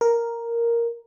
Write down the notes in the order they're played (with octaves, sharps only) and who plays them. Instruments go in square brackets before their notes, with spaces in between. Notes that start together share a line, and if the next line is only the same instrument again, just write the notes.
[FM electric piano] A#4